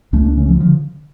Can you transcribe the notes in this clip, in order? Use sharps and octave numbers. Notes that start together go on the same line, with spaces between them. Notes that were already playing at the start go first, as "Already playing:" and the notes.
C#2 A3 C#4
A#3 D4
C#3 A3 C#4
F3 A3
G3
D3 F3